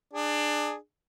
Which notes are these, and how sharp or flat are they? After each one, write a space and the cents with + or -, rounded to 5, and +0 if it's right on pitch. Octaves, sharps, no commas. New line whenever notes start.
D4 +20 G#4 +0